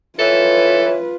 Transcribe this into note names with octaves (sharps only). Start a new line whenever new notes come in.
E3 F4 A4 B4 C#5